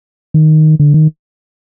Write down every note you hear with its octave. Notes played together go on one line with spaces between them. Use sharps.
D#3
D3
D#3